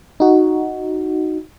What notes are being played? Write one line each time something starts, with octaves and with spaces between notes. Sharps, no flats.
D#4 F#4